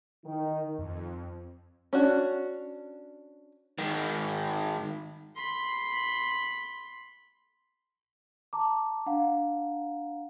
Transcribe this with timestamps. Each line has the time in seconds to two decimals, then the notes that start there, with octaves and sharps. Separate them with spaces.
0.25 D#3
0.79 F2
1.93 C#4 D4 F#4
3.78 G#2 D#3
5.36 B5 C6
8.53 A5 A#5 D6
9.06 D4 F5 F#5 A#5